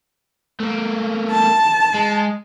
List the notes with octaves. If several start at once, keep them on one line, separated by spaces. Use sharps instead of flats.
A3 A#3
A5
G#3